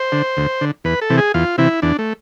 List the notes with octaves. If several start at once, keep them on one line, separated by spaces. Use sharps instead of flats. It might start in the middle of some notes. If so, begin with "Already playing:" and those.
Already playing: C5
D3
D2
D3
E2 B4
A4
C3 E3
G#4
E2 F4
C3 E3 E4
E2 D4
A3